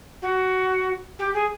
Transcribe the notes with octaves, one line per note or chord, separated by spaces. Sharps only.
F#4
G4
G#4